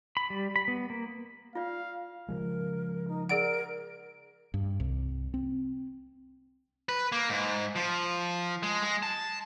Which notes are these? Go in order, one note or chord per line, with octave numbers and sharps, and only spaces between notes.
B5
G3
B5
B3
A#3
F4 D5 F5
C#3 F3 G#3 A#4
D#4
G#4 A#4 D5 F#5 D7
G2
C2
C4
B4
A#3
G#2
F3
G#3
G#3
A5